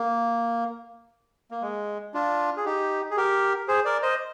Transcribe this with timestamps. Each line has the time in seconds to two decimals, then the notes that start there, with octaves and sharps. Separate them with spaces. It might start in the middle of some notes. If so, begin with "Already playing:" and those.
Already playing: A#3
1.51 A#3
1.62 G#3
2.14 D4 F4
2.57 G#4
2.65 D#4 G4
3.11 G#4
3.17 G4 A#4
3.68 G#4 C5
3.85 A#4 D5
4.02 C5 D#5